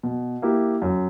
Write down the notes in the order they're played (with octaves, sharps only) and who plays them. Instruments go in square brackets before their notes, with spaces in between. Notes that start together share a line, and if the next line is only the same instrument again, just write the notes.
[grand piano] B2
A#3 E4 G4
F#2